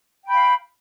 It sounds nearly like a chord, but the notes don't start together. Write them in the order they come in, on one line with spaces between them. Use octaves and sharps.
G5 B5 F5